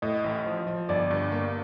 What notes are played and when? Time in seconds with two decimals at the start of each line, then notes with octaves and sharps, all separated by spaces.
0.02 A2 D#5
0.24 A1
0.46 F3
0.67 F3
0.89 G1 D5
1.11 G2
1.32 A#3